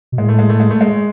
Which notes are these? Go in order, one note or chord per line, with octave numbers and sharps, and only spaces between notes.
B2
A2 G#3
A3
G#3
A3
G#3
A3
G#3